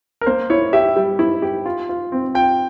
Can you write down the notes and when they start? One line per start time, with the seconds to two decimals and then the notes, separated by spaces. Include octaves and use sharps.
0.21 A#4
0.26 A#3 C5
0.50 E4 C#5
0.73 G4 E5
0.96 G3
1.19 E4
1.42 G4
1.66 F4
1.89 F4
2.12 C4
2.34 F4 G5